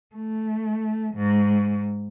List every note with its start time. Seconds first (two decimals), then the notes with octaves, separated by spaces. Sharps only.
0.16 A3
1.15 G#2